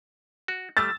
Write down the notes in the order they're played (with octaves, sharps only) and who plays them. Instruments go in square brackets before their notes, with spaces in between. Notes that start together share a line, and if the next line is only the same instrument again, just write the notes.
[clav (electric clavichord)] F#4
[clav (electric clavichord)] G3 A3 [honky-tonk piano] E6 A6